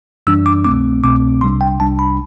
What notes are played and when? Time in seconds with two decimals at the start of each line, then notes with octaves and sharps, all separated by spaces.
0.27 F#2 E3 G3 D4 E6
0.46 D6
0.64 C2 B2 A3 C4 D6
1.03 C2 B2 A3 C4 D6
1.41 C2 C3 G3 D4 C6
1.61 G5
1.80 C2 C3 G3 D4 A5
1.99 B5